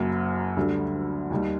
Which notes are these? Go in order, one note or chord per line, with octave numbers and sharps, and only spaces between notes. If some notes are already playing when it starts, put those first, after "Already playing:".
Already playing: F#1 F#2 F#3 A#3
D2 D3 G3
D#2 D#3 G3